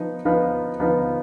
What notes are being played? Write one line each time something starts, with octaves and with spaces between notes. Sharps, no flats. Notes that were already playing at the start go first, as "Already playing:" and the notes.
Already playing: F3 B3 D#4 B4
F3 B3 D#4 B4 F5
F3 B3 D#4 B4 F5